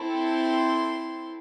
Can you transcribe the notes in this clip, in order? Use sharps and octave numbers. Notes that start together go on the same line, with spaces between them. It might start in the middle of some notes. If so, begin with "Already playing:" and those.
Already playing: C4 E4 A4
C6